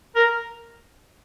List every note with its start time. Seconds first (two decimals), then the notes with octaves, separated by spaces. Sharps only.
0.16 A#4